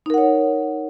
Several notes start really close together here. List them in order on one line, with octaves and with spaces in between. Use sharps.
D#4 A#4 F#5 C#5